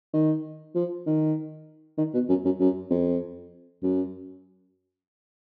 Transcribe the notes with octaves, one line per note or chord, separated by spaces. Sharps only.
D#3
F3
D#3
D#3
B2
F#2
F#2
F#2
F2
F#2